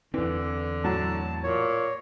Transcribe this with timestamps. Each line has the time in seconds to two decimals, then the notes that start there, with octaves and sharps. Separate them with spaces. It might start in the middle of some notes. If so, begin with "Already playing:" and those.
0.14 E2 D3 E3 C4
0.84 A2 F#3 A5
1.44 A#2 C#5